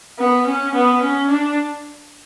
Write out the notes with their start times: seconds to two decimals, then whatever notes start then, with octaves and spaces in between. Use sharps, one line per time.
0.19 B3
0.47 C#4
0.75 B3
1.03 C#4
1.31 D4